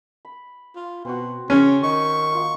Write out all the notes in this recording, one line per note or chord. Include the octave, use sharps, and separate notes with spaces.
B5
F4
B2 C4 F#4
C#3 C#4
D#3 D#5 C#6
A#3 F4 F5